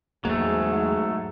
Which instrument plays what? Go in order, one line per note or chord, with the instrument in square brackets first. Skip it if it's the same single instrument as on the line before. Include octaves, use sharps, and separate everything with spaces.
[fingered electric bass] E2 A#3 [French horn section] G#2 [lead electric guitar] F#3 A3 [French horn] G#4